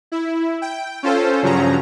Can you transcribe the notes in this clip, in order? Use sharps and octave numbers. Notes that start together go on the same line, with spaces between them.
E4
G5
C#4 F4 A4 C5
G2 C#3 F3 F#3 C#4 A#5